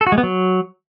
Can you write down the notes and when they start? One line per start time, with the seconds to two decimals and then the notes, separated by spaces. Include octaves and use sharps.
0.01 A4
0.07 F#4
0.12 G#3
0.18 B3
0.23 F#3